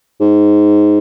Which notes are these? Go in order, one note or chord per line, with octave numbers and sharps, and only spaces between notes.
G#2